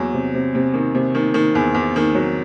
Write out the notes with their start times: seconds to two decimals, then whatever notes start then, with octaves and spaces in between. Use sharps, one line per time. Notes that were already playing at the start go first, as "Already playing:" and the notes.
Already playing: E2 F#3
0.13 C3
0.34 C3
0.55 C3
0.74 D#3
0.95 C3
1.15 D#3
1.34 D#3
1.55 E2
1.74 E2
1.96 D#3
2.15 F#3